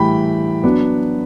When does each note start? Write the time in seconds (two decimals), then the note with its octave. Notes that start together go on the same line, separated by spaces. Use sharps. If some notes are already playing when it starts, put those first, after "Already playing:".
Already playing: A2 E3 G3 G5 B5
0.64 F#3 B3 D4